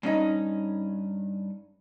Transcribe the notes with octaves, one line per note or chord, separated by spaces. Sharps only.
G2 C#4 D#4